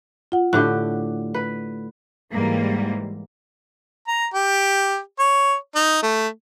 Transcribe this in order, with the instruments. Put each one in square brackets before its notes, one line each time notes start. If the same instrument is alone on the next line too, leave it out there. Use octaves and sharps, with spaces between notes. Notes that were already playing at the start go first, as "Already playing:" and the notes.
[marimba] F4 F#5
[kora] A2 D3 G4 [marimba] F#6
[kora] B4
[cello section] G#2 E3 G3 A#3
[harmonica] A#5
G4
C#5
D#4
A3